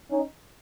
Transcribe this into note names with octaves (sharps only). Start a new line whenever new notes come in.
C#4 D#4